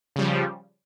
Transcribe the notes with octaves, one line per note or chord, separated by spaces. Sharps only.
C#3 F3 G3